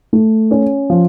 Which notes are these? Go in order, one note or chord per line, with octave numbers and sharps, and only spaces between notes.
A3
C#4
F3